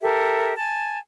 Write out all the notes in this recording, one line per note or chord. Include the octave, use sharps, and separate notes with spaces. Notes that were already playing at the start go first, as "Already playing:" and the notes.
G4 A4 A#4 E5
G#5 A5